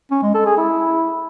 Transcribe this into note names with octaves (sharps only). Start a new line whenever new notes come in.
C#4
G#3
A4
G#4
E4